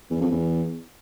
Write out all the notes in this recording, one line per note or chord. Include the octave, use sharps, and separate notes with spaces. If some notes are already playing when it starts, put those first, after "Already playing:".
E2
F2
E2